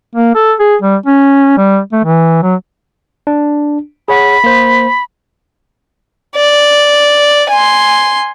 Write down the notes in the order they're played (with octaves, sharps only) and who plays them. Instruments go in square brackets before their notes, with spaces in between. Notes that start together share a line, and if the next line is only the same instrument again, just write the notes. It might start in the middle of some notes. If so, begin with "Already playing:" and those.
[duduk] A#3
A4
G#4
G3
C#4
G3
A3
E3
F#3
[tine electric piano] D4
[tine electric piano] G#4 C#5 F#5 [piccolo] B5
[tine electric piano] A#3 C5
[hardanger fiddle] D5
G#5 C6